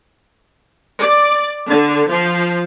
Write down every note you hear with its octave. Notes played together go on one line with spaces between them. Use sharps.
D5
D3
F3